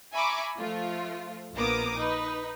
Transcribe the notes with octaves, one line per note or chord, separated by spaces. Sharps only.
E5 G#5 A#5 B5 C#6 D6
F3 A3 F4
A#1 A#3 B3 A#5 D6 D#6
D#4 B4